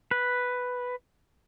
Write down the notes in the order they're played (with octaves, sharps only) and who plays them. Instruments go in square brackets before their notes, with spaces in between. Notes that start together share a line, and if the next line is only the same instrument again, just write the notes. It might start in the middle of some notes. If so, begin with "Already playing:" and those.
[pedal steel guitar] B4